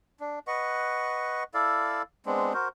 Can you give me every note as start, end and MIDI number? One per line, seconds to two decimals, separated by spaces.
0.20 0.39 62
0.47 1.43 71
0.47 1.43 75
0.47 1.43 78
0.47 1.43 85
1.54 2.02 64
1.54 2.02 69
1.54 2.02 74
1.54 2.02 77
2.26 2.53 56
2.26 2.53 59
2.26 2.53 60
2.26 2.53 62
2.54 2.68 66
2.54 2.68 70
2.54 2.68 72